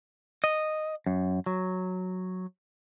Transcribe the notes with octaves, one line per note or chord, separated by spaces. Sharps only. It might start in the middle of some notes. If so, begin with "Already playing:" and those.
D#5
F#2
F#3